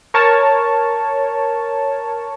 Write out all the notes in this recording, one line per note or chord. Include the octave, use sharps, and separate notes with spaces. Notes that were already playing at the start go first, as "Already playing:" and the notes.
A#4 C#5 A5